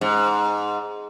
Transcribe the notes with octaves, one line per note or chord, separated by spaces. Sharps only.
G#2